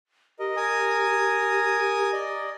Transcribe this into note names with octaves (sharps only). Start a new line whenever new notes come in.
G4 A#4 D#5
A#4 G#5 D#6
D5 D#5